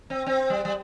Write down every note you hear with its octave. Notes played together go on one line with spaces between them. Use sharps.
C4
C4
G3
G3